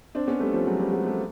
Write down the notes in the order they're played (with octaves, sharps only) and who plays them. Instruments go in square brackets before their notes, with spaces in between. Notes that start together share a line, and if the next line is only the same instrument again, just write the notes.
[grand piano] C4 D4
B3 C#4
G3 A3
F3 G3
F#3 G#3
F3 G3
F#3 G#3
G3 A3